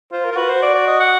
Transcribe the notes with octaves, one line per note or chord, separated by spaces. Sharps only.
F4 C5
A#4
F4
F#4 B4
C5
D5
D5
D#5
F#5